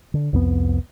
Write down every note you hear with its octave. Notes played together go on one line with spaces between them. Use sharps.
D3
C2 F2 B3